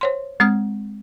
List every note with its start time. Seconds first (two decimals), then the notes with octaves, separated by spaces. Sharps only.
0.01 C5 C#5 C6
0.40 G#3 C4 D#6 F6 G#6